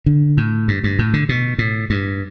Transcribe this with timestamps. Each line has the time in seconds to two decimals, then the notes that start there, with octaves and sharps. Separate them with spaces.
0.06 D3
0.37 A2
0.68 G2
0.84 G2
0.99 A2
1.13 D3
1.29 B2
1.58 A2
1.90 G2